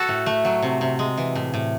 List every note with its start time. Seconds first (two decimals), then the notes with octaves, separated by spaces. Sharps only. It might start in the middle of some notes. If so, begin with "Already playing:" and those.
Already playing: F#4 A4
0.08 A2
0.26 A3
0.45 F#3
0.62 C3
0.81 C3
0.99 G#3
1.17 E3
1.35 A2
1.54 A2